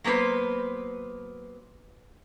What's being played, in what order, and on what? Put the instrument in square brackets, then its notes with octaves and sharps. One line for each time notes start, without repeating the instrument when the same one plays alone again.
[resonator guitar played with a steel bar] F#3 A#3 B3 B4 C5